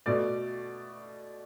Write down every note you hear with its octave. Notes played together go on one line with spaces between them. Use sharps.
B2 A3 D5